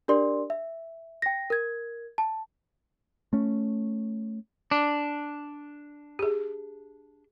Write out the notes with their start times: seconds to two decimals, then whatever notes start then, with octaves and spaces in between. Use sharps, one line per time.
0.08 D4 G4 A#4 D5 C6
0.50 E5
1.22 G5 A#6
1.50 A#4 G#6
2.18 A5
3.33 A3 C#4
4.71 D4
6.19 G4 G#4